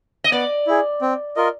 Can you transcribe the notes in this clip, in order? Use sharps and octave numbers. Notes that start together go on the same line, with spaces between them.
D#5
B3 D5
E4 G#4
C4
F4 A#4 D#5